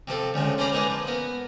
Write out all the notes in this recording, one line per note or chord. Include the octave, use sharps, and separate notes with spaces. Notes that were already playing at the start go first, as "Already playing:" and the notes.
C3 F3 C4 A4
D2 C#3 F3 G#3
C#4 F4 C5 D5 A#5 B5
G#3 A#3 D#4 E4 G#4 B4
F3
B3 A#4